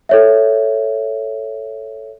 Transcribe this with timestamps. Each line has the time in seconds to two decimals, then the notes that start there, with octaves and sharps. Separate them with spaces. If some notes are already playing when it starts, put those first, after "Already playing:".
0.09 A4 C#5 E5